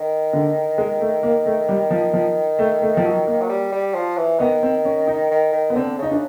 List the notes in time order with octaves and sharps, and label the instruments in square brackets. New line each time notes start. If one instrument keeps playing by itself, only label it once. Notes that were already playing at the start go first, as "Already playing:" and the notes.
Already playing: [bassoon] D#3
[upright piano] D3
G#3
A3
A#3
A3
G3
F3
F3
A3
A3
F3
F#3
A#3
[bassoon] F#3
G3
G3
F3
E3
[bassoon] D#3 [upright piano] B3
[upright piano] C4
C#4
D#4
[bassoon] D#3
D#3
[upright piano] B3
[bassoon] D3 [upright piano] C4
[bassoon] C#3 [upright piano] D#4
[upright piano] D4